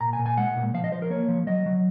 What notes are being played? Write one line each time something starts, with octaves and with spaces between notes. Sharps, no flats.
A#2 A#5
G#5
A#2
G#5
G#3 F#5
A#2
F3 F5
D#5
F3 C5
A#4
A#3 C#5
F3
F#3 D#5
F#3